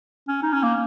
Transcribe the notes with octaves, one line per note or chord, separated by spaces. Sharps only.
C#4
D#4
C#4
A#3